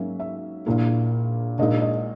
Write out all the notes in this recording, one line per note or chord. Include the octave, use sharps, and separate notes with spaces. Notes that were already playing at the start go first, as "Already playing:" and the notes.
Already playing: G#2 F#3 A#3 C#4 E5
E5
A#1 A#2 A#3 E4
A#1 A#2 G#3 D#4 D#5
D#5